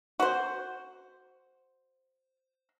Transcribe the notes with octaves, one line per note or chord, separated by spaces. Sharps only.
F#4 C5